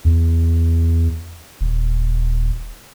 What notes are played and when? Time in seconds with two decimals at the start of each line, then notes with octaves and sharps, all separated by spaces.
0.05 E2
1.61 D#1